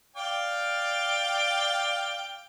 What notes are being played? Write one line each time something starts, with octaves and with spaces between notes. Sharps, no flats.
D5 F5 G5